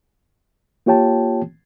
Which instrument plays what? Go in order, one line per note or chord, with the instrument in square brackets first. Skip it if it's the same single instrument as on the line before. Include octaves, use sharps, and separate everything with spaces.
[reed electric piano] A#3 F4 G4 C#5 G5 A5